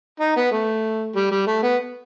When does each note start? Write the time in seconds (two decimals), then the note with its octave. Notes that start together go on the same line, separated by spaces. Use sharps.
0.20 D#4
0.37 B3
0.52 A3
1.15 G3
1.31 G3
1.47 A3
1.63 B3